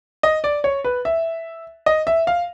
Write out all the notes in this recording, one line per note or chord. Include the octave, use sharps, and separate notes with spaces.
D#5
D5
C#5
B4
E5
D#5
E5
F5